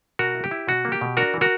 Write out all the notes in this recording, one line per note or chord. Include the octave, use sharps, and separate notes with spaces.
B2 F#4 A#4
E4
G4
E4
B2 F#4
A#3
G4
B2
D4 F#4 A#4
E3
F#4 A#4